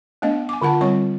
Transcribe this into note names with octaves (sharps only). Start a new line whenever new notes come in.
A3 B3 D4 D#5
G#5 D6
D3 F4 A#4 F#5 A5
G3 C4 C#5 C#6